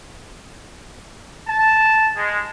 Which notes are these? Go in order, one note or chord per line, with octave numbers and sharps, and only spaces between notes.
A5
G#3